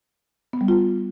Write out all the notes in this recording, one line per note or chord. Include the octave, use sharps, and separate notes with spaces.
B3
G3
F4